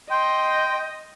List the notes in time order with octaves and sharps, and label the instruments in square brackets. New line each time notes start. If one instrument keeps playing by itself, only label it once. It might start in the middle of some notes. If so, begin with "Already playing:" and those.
[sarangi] D#5 [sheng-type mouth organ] G5 [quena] C6